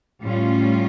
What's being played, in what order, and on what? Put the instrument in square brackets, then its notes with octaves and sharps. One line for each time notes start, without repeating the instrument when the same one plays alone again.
[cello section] A2 G3 C#4 F4